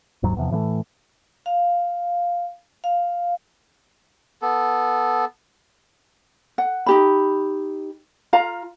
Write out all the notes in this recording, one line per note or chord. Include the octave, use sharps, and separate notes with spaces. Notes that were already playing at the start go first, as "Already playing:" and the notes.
F#1 D#2 G#2 F#3
E2 C3 F3
A2 E3 G3 A3
F5
F5
B3 A4
F#5
D#4 G4 B5
F4 F5 A#5